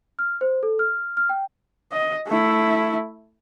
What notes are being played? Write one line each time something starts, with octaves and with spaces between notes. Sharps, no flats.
F6
C5
A4
F6
F6
G5
D#5
A3 E4